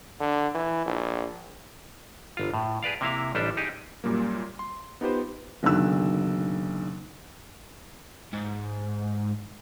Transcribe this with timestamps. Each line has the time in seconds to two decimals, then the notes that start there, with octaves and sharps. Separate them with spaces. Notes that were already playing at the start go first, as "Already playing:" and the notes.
0.20 D3
0.54 E3
0.86 A#1
2.37 G1 F4
2.54 A2
2.83 G#4 B4 D5 F5
3.01 C3 A#3 E4 F5
3.35 A1 G3 D4 G4 A4
3.57 D#4 G4 G#4
4.04 F#2 A#2 G3 A#3
4.59 C6
5.01 B3 D#4 F4 G4 B4 C5
5.63 F#1 B1 D3 D#3 E6 F#6
8.33 G#2